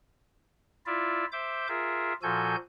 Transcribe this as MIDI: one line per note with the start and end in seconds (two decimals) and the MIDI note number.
0.86 1.25 64
0.86 1.25 65
0.86 1.25 74
0.86 1.25 76
1.32 1.67 72
1.32 1.67 76
1.32 1.67 86
1.32 1.67 91
1.68 2.13 65
1.68 2.13 68
1.68 2.13 70
1.68 2.13 76
2.23 2.56 46
2.23 2.56 53
2.23 2.56 66
2.23 2.56 69
2.23 2.56 80
2.23 2.56 91